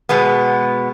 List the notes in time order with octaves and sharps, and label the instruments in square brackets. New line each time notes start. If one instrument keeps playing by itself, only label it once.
[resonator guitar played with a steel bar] B2 G#3 B3